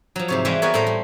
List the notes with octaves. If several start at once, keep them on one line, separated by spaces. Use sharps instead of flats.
F3 F#3
G#2 C3 C#5
E3 G3 G#3 E4 F4 B4
B3 F#4 G#4 A#4 B4 C#5
A2 G3 A4 C5 A#5
G3